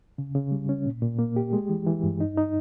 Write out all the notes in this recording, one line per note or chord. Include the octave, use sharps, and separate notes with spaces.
C#3
C#3
G3
C#4
A#2
A#2
A#3
G4
G#3
E3
E3
G2
D#4
D#4